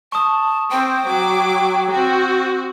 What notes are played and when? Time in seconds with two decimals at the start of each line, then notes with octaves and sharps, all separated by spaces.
0.12 A5 C#6 D#6
0.70 C4 C5 G5
1.06 F#3 D6
1.91 C4 F#4